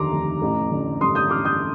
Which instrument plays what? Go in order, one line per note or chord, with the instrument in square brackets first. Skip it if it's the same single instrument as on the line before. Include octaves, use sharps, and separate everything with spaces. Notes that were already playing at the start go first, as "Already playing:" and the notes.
Already playing: [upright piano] F1 D#2 D3 A#5 C6 D6
F1
A1
D3
G2 C6 D#6
D#6 G6
A1 D6 F6
D#6 G6